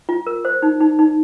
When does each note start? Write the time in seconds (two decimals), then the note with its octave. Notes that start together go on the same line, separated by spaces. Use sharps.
0.09 F4
0.27 A#4
0.45 C5
0.62 D#4
0.81 D#4
0.99 D#4